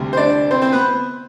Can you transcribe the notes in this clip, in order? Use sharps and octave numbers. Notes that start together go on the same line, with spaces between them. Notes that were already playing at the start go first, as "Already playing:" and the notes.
Already playing: D2 C3 G3
C5
D4 D5
C4 C5
C4 C5
B3 B4